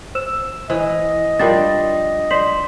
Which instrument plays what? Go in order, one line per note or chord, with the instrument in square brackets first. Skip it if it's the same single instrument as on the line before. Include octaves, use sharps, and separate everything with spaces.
[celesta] C5 E6 E7
[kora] E3 [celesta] C5 [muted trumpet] D#5
[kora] F3 G3 D4 [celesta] A#4 A6
[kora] C5 [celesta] D5 B6 F#7